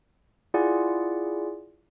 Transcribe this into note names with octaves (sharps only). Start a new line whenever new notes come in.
E4 F4 G#4 D5 F#5 G#5